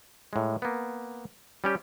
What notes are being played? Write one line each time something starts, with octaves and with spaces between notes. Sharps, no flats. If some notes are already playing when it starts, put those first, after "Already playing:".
A2 G#3
A#3 B3
G3 C#4 G4